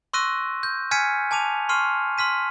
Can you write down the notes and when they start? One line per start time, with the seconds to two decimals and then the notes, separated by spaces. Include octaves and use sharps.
0.13 C6 C#6 E6 F#6 A#6 D#7
0.63 G6
0.91 G#5 F6 G#6 B6 C#7 D#7
1.31 G#5 A5 D6 D#7 F7
1.69 C6 C#6 F6 C7 D#7
2.18 C6 F6 B6 D#7